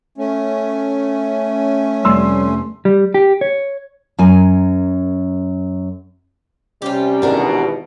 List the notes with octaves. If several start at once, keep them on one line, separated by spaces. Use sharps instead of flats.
A3 C#4
F1 G3 C6 E6
G3
G4
C#5
F#2 A#4 G#5
C3 G3 C#4 F4 G4
G#1 E2 B2 B3 D4 A#4